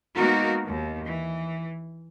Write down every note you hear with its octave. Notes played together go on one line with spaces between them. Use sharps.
G#3 A#3 B3 D#4 F#4 A#4
D#2
E3